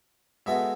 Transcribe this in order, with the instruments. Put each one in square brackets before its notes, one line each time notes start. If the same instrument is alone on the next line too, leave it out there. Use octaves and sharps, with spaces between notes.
[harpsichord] G#3 B3 F#4 A4 [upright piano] E5